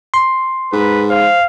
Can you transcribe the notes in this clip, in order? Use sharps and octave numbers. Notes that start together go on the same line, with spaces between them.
C6
G#2 B4
C5 F5